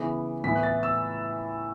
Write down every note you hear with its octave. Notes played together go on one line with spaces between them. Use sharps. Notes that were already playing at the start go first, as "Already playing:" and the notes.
Already playing: C#3 E3 B3
A2 E3 B3 E4 B6
F#6
A6
E6